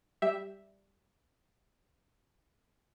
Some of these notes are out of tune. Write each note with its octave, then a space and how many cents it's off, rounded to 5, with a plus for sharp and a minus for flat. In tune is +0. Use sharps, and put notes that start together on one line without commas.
G3 +0 G4 +0 E5 +0